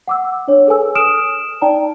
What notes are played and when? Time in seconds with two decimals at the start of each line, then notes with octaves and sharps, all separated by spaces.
0.08 F#5 D6 E6
0.48 D4 C#5
0.67 G#4 A4 B4 G#5 E6
0.95 D#6 F6 D7 E7
1.61 D#4 D5 G5 A5 A#5